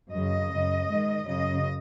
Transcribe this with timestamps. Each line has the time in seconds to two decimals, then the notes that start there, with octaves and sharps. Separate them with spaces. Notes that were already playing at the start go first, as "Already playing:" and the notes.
0.11 F#2 C#3 D#5
0.50 F#2
0.55 C#3
0.89 G#2 D#3
1.27 F#2 C#3 D#5